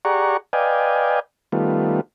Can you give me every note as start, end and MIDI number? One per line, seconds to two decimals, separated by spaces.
0.05 0.37 67
0.05 0.37 68
0.05 0.37 74
0.05 0.37 78
0.05 0.37 82
0.05 0.37 85
0.53 1.20 71
0.53 1.20 74
0.53 1.20 75
0.53 1.20 77
0.53 1.20 79
0.53 1.20 80
1.52 2.01 51
1.52 2.01 55
1.52 2.01 57
1.52 2.01 59
1.52 2.01 65